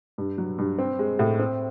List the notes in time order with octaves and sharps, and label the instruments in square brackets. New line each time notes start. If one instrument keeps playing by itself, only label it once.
[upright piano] G2
F#3
G2
C4
G#3
A2
C4